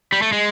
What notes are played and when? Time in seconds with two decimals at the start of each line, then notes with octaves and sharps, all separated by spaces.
0.12 G3
0.22 A3
0.32 G#3